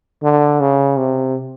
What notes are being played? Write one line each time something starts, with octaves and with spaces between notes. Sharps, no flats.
D3
C#3
C3